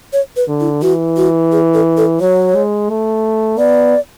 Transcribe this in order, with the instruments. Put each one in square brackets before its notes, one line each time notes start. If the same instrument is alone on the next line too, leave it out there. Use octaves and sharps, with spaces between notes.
[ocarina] C#5
B4
[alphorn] D3
[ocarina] E4
[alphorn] E3 [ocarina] F#4
[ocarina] F#4
G#4
A4
A4
[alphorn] F#3 [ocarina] C#5
[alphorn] G#3
A3
[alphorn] B3 [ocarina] D5